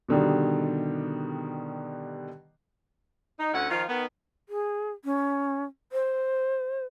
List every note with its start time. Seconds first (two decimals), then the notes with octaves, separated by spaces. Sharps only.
0.08 B2 D3 D#3 G3
3.39 D#4
3.53 D2 C#4 E4 F#5
3.70 D#3 F3 F4
3.88 D#3 B3
4.49 G#4
5.05 C#4
5.92 C5